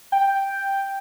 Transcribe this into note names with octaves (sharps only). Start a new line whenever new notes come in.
G5